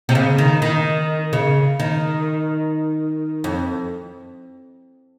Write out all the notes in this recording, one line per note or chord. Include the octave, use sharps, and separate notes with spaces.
C3
C#3
D#3
D#3
C#3
D#3
F2